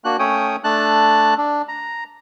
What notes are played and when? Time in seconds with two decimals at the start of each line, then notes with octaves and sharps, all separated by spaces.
0.05 A#3 D4 F#4 F#6
0.19 A3 C#4 C#5 G5 D#6
0.64 A3 D4 A5 F#6
1.37 D4
1.68 A#5